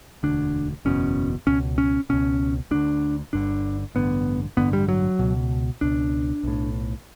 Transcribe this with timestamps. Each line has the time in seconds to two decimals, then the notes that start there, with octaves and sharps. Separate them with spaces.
0.23 E1 D2 D3 D4
0.85 F#1 E2 B2 C#4
1.47 C#2 B2 C#4
1.78 C#4
2.09 C#2 B2 C#4
2.71 D2 D3 D4
3.33 G1 G2 D3 D4
3.95 A1 G2 D3 B3
4.57 A1 G2 D3 B3
4.73 G3
4.89 F#3
5.19 C#2 B2
5.81 C#2 B2 D4
6.43 B1 A2